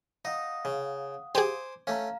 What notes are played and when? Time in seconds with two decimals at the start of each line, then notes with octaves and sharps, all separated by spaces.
0.25 D#4 F5 F#5 D#6
0.65 C#3
1.35 G4 G#4 C5 G#5 D6
1.87 A3 C#4 F5 A#5